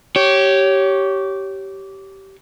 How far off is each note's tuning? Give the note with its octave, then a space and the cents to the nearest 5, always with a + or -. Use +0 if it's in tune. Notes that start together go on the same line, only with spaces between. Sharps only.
G4 -15 C#5 +0